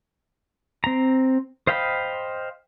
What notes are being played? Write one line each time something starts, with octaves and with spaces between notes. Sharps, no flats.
C4 A#5
C5 D#5 F5 G5 B5